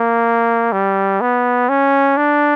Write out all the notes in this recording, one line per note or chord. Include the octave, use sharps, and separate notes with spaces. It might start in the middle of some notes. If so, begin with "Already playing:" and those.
Already playing: A#3
G3
B3
C#4
D4